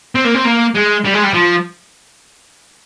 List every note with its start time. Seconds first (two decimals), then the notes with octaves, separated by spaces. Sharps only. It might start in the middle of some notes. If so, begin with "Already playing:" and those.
0.15 C4
0.25 A#3
0.34 C4
0.45 A#3
0.75 G#3
1.04 G3
1.14 G#3
1.23 G3
1.34 F3